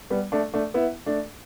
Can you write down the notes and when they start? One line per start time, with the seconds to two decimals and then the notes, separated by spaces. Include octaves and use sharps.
0.10 G3 B3
0.32 A3 D4
0.54 A3 D4
0.74 B3 E4
1.06 A3 D4